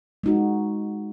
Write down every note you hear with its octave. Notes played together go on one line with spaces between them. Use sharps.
G#3 D#4 F#4